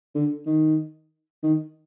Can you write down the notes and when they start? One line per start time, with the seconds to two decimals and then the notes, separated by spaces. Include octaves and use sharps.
0.15 D3
0.46 D#3
1.43 D#3